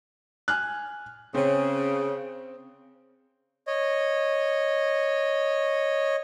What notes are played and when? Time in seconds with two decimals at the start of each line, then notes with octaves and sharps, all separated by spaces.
0.48 G#5 F6 F#6
1.34 C#3 C4
3.67 C#5 D#5